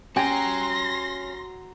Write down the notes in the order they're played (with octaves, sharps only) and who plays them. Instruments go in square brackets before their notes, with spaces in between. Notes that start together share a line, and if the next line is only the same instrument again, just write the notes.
[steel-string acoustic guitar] C#4 [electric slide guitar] F#4 A#5 [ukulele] G4 G5 G#5 [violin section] C6 A#6